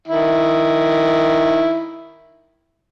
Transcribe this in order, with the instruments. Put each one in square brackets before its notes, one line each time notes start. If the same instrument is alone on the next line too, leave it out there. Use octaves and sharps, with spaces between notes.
[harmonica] D#3 E4